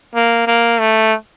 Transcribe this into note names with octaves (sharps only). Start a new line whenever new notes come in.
A#3
A#3
A3